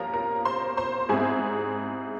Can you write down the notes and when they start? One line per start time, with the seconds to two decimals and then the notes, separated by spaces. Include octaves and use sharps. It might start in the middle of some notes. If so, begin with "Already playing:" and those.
Already playing: G2 F3 A#3 C#4 F4 A#4 A#5
0.14 A#4 A#5
0.45 C5 C6
0.77 C5 C6
1.09 G#2 G3 C4 E4 G#4 G#5